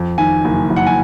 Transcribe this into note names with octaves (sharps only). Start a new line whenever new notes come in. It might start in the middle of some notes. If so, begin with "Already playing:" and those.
Already playing: F2
D#3 G#5
F#1
F#1
F#5
G#5